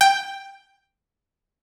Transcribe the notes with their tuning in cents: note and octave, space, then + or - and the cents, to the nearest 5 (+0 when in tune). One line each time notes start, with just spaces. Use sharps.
G5 +5